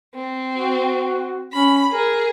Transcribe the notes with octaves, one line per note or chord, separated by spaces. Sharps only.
C4
F#4
C#4 B5
G#4 A#4